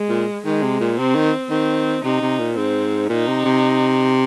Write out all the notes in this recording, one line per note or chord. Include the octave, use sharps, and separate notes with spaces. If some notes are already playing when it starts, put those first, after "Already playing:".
Already playing: G#3
A#2
D#3 G#3
C3
A#2
C3 C4
D#3
D#3 C4
C3 D#4
C3
A#2
G#2 C4
A#2 D#4
C3
C3